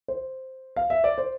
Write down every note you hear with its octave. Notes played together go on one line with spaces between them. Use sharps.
C5
F5
E5
D5
C5